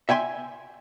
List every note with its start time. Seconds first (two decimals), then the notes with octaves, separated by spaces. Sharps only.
0.09 E5 G5 G#5 C6